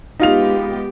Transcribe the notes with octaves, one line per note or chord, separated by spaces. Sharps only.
G#3 B3 D#4 F4 G4 F7